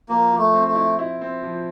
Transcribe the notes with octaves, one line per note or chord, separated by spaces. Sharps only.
F3 A#3
F3
A3
C4
A3
E4
E4
C4
F3